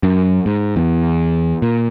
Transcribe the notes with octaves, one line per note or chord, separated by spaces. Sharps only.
F#2
G#2
E2
A#2